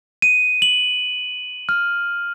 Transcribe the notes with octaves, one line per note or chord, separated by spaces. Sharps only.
D#7
F#7
F6